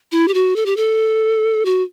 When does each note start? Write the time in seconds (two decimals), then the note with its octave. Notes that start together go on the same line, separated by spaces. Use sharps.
0.12 E4
0.28 G4
0.34 F#4
0.56 A4
0.66 G4
0.77 A4
1.65 F#4